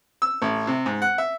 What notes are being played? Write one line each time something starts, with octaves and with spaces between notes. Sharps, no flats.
E6
A1
C3
G#2
F#5
E5